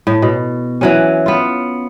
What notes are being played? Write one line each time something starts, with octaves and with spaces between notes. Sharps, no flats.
A2
B2
E3 F#3 C#4
B3 F4